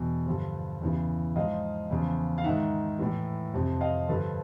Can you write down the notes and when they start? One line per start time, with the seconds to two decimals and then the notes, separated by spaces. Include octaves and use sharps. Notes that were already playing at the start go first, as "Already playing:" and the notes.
Already playing: E2 B2
0.26 G2 D3 F3
0.81 E2 C#3 E3
1.36 G#2 F3 D#5 F5
1.90 E2 C#3 F3
2.38 F5
2.44 G#2 D#3 E5 F#5
2.99 A2 E3
3.53 F2 C3 F3
3.81 D#5 F5
4.08 G2 D3 F3 A4 B4